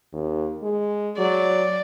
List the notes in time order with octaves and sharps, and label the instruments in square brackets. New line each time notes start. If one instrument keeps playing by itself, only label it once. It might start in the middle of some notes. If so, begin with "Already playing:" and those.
[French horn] D#2
G#3
[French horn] F#3 [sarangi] D5